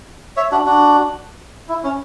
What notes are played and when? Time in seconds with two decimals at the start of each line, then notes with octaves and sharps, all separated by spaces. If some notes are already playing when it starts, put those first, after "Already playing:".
0.37 C#5 E5
0.52 D4 F#4
0.66 D4 F#4
1.69 E4
1.84 C#4